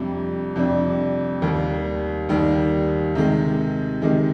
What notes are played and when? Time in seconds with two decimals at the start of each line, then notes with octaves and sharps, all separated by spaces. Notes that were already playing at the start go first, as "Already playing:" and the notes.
Already playing: F2 C3 G3 D4
0.56 F2 C3 G3 D4
1.42 D#2 D#3 G3
2.29 D#2 D#3 G3
3.15 C3 D#3 G#3
4.02 C3 D#3 G#3